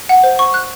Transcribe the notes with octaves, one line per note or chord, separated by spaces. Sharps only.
F#5
C5
C#6
F#6